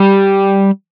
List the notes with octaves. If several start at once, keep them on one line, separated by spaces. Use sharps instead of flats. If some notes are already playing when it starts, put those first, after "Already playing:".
Already playing: G3